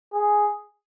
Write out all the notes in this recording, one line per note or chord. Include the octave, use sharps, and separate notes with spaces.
G#4